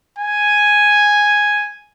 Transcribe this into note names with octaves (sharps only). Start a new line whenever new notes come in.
G#5